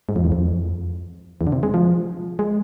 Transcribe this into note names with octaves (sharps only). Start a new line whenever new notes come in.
G#2
F2
E2
F2
E2
D3
C3
G#3
F3
G#3